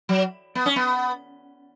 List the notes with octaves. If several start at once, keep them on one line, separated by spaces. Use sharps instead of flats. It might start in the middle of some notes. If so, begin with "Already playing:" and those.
F#3
B3
C#4
B3